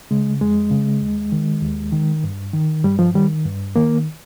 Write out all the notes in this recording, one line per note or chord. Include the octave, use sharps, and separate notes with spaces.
C#3 G#3
F2 G#3
C#3
D#2
D#3
D#2
D#3
G2
D#3
G2 G3
F3
D#3 G3
G2
D#3 A#3